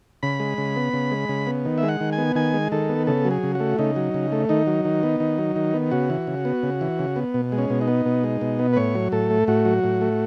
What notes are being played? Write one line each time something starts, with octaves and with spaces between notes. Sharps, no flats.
C#3 B5
G#3
C#3
B3
C#3
G#3
C#3
B3
D#3
E5
G#3
F#5
D#3
G#5
B3
D#3 G#5
G#3
D#3 A4
B3
C#3 A4
F#3
G#4
C#3
F#4
A3
C#3 D#4
F#3
C#3
A3
D#3 D#4
F#3
D#3
B3
D#3
F#3
D#3
B3
C#3 F#4
E3
C#3
B3
C#3
E3
C#3
B3
B2
G#3
C#4
B2
D#4
B3
B2
G#3
B2
B3
B4
A2 C#5
F#3
A2 A4
A3
A2 F#4
F#3
A2
A3